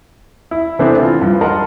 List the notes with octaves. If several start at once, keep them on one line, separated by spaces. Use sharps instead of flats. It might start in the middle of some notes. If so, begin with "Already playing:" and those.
E4
C3 E3 A3 B3 C4 D4
F4
G2 F3
A#4 D#5 F#5 A5 C6